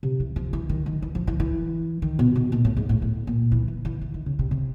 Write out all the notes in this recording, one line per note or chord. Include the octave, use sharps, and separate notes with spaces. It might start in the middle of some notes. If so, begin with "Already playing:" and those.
C3
E3
F3
E3
D#3
D#3
E3
F3
E3
E3
D#3
B2
B2
A#2
A2
G#2
A2
A2
A#2
E3
E3
E3
E3
D#3
C#3
C3
C3